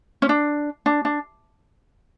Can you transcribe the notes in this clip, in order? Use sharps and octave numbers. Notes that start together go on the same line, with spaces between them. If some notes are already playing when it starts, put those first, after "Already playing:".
C#4
D4
D4
D4